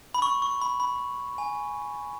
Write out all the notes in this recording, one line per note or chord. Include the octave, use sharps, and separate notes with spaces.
B5
C#6
C#6
B5
B5
G#5